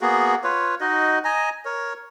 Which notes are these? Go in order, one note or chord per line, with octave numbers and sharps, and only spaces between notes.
A#3 B3 F#4 G#4
F4 B4 C#5
D#4 F#4 D#5
D#5 G#5 A#5
A#4 C#5